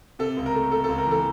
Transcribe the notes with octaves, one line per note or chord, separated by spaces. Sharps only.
C3 A4
C#2
A#4
A3
A3 A4
C#2 A4
A#4
E3 A4